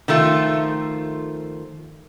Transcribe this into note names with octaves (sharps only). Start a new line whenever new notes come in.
D#3 F3 A3 F4